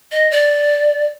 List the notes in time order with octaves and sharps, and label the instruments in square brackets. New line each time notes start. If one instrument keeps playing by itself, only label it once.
[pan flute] D#5
D5